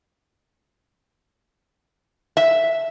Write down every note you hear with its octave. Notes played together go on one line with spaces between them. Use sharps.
E5